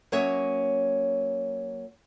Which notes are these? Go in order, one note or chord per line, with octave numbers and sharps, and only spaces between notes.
F#3 A#3 C#4 C#5 D#5 E5